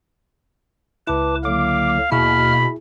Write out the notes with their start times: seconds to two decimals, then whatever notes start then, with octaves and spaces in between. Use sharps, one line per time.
1.07 C#2 E4 B4 A5 D6
1.45 D3 F#3 A#3 F5 D6
2.12 D#2 B2 A#3 E4 G#4 B5 F6